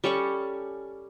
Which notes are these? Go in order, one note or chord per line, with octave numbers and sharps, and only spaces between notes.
G3 C#4 A4 C#6